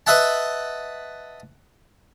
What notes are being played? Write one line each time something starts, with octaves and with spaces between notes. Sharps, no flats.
B4 D#5 E5 F#5 A5